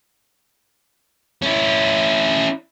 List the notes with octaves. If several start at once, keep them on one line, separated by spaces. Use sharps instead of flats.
C#4 E4